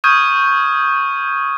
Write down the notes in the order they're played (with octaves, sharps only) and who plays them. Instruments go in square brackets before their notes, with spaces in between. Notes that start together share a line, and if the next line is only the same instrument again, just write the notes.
[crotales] C#6 D#6 F6 G6 G#6 D#7